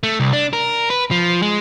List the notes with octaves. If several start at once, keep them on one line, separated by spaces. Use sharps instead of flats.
A3
C2
D4
A#4
B4
F3
G#3